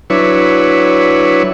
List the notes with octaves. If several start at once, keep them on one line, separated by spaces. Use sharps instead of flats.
F#3 D4 E4 B4 C#5